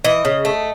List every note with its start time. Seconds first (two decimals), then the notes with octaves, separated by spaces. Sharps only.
0.04 E3 D#5
0.25 C#3
0.45 A3